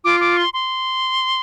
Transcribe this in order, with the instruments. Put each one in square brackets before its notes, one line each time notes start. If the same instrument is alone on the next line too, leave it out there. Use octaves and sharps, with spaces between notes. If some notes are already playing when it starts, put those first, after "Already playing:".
[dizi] F4 [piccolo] D6
[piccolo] D6
C6
C6